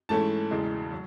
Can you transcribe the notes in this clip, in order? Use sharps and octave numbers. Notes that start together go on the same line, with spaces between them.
G#2 E3 A3 C#4 E4 A5
E1 E2 C#3 E3 G#3
F#3